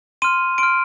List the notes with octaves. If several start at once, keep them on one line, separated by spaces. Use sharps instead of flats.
C6 F6 D#7
C6 F6 D7